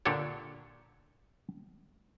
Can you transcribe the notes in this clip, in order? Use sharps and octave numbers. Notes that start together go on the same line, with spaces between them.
A#2 D3 D4 G4 A4 C#5